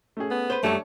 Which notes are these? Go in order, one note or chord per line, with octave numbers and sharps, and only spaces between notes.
A3 C#4 G#4
B3
B4 C5
F#2 G3 A3 D4 C#5 A5 C#7